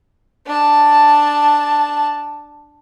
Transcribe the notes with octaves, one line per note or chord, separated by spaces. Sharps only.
D4 A5